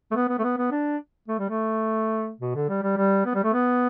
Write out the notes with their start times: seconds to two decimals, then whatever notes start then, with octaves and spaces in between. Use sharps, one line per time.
0.11 A3
0.15 B3
0.29 B3
0.39 A3
0.44 B3
0.58 B3
0.71 D4
1.28 A3
1.39 G3
1.49 A3
2.40 B2
2.55 D3
2.69 G3
2.83 G3
2.97 G3
3.26 B3
3.35 G3
3.44 A3
3.53 B3